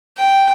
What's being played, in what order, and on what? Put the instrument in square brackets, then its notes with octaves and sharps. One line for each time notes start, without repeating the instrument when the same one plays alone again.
[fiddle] G5